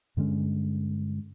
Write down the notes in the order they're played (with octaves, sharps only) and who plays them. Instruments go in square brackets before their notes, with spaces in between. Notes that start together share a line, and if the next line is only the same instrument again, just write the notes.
[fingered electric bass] G2 D3 G#3 C#4